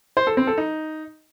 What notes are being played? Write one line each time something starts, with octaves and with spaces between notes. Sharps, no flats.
C5
A4
C4
A4
D#4